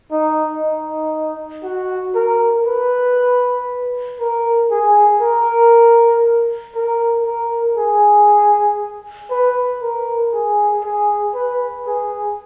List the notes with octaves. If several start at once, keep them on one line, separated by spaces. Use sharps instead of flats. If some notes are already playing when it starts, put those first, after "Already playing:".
D#4
D#4
F#4
A#4
B4
A#4
G#4
A#4
A#4
A#4
G#4
B4
A#4
G#4
G#4
B4
G#4